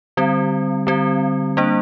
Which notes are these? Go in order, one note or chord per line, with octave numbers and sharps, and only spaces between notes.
D3 G3 C4
D3 G3 C4
G3 A#3 D4